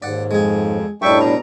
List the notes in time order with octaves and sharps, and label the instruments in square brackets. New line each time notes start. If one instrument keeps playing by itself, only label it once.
[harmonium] D#2 G#2 [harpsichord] D5 F#5
[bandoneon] F2 [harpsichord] G#3 G#4
[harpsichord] F#2 D#4 [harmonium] A2 G3 D4 [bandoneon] E5 G5 C#6
[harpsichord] B2 [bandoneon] A#5